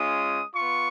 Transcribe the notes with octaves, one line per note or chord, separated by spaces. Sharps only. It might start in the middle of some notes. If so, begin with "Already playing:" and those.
Already playing: G#3 C#4 F4 D#6
B3 F4 C#6